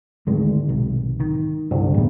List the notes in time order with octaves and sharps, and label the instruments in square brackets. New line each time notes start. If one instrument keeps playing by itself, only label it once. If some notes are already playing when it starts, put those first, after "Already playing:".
[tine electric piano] G#1 [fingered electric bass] D2 G#3
[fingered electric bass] B1 C3
D#3
[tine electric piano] G1 C2 G2
[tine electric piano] E2 [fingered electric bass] A2 G3